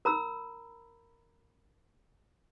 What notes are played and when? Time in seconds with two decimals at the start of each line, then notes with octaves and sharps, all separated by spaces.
0.05 A#4 A#5 B5 E6